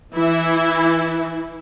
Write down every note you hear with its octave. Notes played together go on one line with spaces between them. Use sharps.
E3 E4